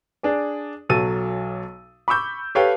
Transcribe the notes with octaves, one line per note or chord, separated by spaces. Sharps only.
D4 G#4 D5
B1 F#3 A4 E6 A6 D#7
B5 C#6 D6 E6 G6
G4 A4 B4 C#5 F5 G5